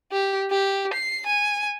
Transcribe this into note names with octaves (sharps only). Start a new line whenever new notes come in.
G4
G4
C7
G#5